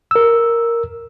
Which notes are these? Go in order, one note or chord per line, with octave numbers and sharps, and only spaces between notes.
A#4 E6